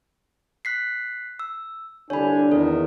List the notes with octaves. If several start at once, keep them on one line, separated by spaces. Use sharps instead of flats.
F#6 B6 C7
E6
C2 D3 D4 C#5 G#5 B5
E2 D#3 C4 A4